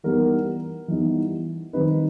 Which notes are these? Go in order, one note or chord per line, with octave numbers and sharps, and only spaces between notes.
E3 G3 B3 D#4 A#4
E3 G3 B3 D#4
D#3 G3 C4 D#4 B4